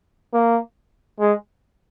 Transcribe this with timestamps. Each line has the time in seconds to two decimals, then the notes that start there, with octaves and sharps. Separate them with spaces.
0.33 A#3
1.20 G#3